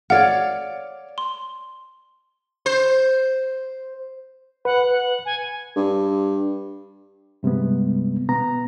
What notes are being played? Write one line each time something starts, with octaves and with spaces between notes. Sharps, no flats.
C#5 D5 F5 F#5
C6
C5
B4 F#5
F#5
G#5
G2
G2 C3 G3 G#3 B3
B2 B3 A#5